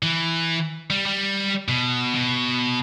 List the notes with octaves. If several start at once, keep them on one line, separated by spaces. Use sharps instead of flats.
E3
G3
G3
B2
B2